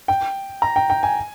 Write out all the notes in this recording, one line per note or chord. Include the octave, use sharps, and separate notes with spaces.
G5
A#5
G5
G5
G#5